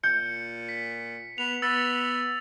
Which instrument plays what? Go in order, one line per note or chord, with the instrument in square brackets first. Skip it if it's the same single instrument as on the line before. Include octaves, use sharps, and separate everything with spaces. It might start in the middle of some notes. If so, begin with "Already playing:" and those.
[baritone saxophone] A#2 [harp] G6 [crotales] C#7
[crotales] B6
[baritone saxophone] B3 [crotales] F7
[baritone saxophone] B3 [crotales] E6 A6